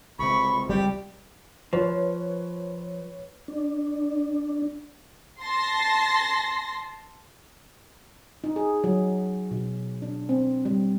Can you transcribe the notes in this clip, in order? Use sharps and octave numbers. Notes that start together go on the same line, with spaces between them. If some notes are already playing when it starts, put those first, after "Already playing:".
C#2 C3 B5 C#6
G3 G4
F3 B4 C#5
D4
A5 C6 A#6
D#4
G#4
F#3
B2
D4
C4
G3